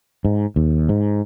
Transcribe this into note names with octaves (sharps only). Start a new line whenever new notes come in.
G#2
D#2
G#2